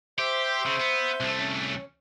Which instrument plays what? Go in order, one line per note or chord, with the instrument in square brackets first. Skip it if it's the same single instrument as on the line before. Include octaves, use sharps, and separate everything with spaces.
[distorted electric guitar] G4 [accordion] C5 E5 C6
[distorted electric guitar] C#3
B3
C2 A3
[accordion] C#4